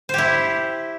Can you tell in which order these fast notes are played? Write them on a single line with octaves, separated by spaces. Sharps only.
C5 G4 E4